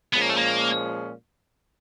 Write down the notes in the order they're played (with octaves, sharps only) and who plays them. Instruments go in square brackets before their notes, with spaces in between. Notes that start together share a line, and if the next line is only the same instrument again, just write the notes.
[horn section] A#2 F3 G#3 C#4 [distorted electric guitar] B3
[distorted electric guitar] A#3
A3
A#3